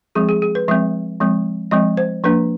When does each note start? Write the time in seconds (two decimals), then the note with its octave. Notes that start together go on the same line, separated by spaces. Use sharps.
0.15 F3 G#3 C4 G#4
0.29 G#4
0.42 G#4
0.55 B4
0.68 F3 G#3 C4 E5
1.20 F3 G#3 C4
1.71 F3 G#3 C4 D#5
1.97 C5
2.23 F3 A#3 D4 B4